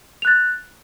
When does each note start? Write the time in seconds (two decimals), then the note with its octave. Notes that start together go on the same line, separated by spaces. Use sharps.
0.22 F7
0.25 F#6
0.27 A6